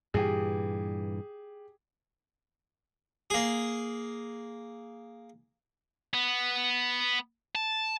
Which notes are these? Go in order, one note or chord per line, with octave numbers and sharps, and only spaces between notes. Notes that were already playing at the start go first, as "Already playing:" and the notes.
G2 A#2 E3 G4 G#4
A#3 G#4
B3
A5